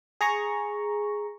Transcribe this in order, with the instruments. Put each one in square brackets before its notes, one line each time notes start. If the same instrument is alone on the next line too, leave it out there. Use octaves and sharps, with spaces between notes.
[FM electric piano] G#4 A#5 C#6